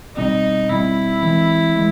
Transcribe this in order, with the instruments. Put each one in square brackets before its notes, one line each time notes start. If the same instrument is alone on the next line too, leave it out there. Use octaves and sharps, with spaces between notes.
[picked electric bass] B2 G3 C4 [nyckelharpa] D#4
[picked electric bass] B2 G3 C4 [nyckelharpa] E4
[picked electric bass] E3 G#3 C4
E3 G#3